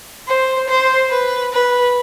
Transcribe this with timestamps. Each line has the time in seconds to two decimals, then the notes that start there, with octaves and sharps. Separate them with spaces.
0.28 C5
0.69 C5
1.10 B4
1.53 B4